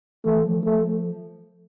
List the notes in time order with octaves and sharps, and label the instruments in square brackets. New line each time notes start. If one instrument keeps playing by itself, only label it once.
[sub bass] E3 [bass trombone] A3
[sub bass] F3
[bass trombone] A3